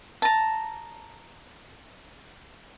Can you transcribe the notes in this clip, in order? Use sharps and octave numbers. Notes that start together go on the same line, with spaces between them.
A5 A#5